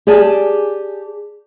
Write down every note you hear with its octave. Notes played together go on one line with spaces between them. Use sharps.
G4 G#4 D5 G#5 A5